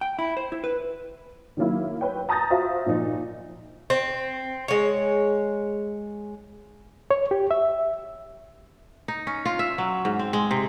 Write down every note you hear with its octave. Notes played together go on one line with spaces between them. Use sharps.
G5
E4
C5
E4
B4
D#3 F#3 A#3 E4
B4 C#5 G5
A5 A#5 D#6 G6 A6 A#6
F4 F#4 C5 E5 F5
A#2 F3 D#4
C4
G#3 C#5
C#5
G4
E5
D#4
C#4
F4
E5
F#3
G#2
C4
G#3
C3